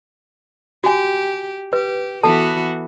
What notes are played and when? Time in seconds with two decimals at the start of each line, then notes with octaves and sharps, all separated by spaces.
0.84 F#4 G4 G#5
1.73 G4 B4
2.23 E3 B3 F#4 A4 A5